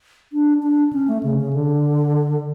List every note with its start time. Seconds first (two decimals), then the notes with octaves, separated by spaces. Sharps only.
0.33 D4
0.63 D4
0.93 C#4
1.08 A3
1.23 C#3
1.38 C#3
1.53 D3